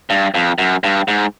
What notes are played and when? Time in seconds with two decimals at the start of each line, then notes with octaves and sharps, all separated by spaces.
0.10 G2
0.34 F2
0.58 F#2
0.84 G2
1.08 G#2